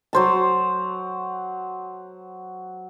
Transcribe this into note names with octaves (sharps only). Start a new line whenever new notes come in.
F#3 C5 A5